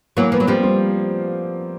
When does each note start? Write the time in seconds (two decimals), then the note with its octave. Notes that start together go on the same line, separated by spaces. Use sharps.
0.17 E3 F#3 A#3
0.32 F3 B3
0.40 F#3
0.47 F3 G3 C4
0.63 C4